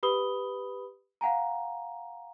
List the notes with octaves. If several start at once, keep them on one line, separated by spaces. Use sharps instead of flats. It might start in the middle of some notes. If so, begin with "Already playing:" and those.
G4 B4 B5 D#6 G7
F5 F#5 G#5 A#5